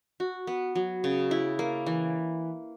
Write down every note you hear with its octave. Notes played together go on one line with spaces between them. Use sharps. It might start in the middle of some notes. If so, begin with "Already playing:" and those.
F#4
B3
F#3
C#3
E4
A#3
E3